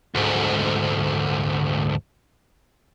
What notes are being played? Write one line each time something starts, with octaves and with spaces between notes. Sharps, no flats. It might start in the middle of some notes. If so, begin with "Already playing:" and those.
D2 G#2